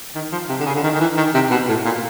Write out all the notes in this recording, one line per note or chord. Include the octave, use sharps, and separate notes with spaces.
D#3
F3
C3
D3
C#3
D3
D#3
D#3
E3
D#3
C3
B2
A2
A#2